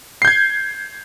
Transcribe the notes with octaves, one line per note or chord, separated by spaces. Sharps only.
G6 G#6 C7